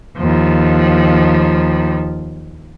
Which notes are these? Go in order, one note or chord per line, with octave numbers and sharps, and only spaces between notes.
D#2 F3